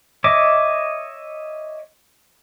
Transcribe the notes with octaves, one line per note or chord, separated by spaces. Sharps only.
C#5 D#5 E5 D6